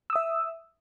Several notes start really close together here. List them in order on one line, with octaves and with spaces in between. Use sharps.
E6 D#6 E5